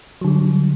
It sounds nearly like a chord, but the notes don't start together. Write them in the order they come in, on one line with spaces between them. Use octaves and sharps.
F#3 D3 G3